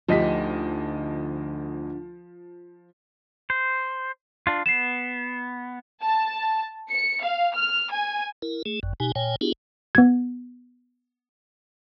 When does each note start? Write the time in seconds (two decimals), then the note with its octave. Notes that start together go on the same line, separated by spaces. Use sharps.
0.08 D2 D3 F3 D#4 G4 D#5 B6
3.50 C5
4.47 D4 F4
4.66 B3 C7 E7
6.02 A5
6.90 C#7
7.21 F5
7.53 F6
7.90 G#5
8.42 E4 A#4
8.66 A3 G#4
8.83 G1 F#2
9.00 B2 D#4 G4 G#5
9.15 A#2 C#5 G5 G#5
9.41 B3 D4 E4 F4 G4 G#4
9.95 B3 G#6